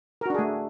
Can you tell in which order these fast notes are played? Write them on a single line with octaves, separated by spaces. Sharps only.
A#4 F#4 D4 G#4 A3